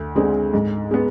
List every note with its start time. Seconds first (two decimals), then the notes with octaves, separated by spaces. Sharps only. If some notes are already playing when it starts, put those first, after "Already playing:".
Already playing: D2
0.15 D3 G#3 C4 G#4
0.54 G#2
0.91 G#3 B3